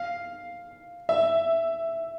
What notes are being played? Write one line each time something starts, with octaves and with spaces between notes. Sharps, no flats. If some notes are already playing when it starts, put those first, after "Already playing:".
Already playing: F5
E5